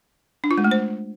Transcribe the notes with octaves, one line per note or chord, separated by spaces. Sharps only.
D4
F4
G#3
A3
C5